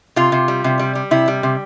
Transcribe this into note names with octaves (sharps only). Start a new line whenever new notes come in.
C3 F4
C3
G3
C3
G3
G3
C3 E4
G3
C3